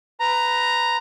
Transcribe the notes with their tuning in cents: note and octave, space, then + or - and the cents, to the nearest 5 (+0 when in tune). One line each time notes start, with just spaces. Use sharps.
B4 +15 A#5 +0